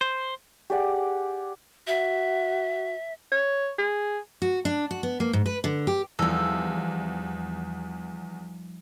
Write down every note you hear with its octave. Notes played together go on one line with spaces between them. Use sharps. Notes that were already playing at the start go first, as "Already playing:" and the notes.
C5
G4 G#4 D5 F#5
F#4 E5
C#5
G#4
F#4
D4
F#4
B3
A#3
G#2
B4
D3
G4
E2 F3 G3 D#4 A4 E5